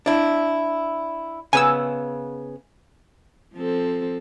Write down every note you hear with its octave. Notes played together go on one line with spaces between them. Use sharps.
D4 E4
C#3 B3 G#5 E6
F3 C4 A4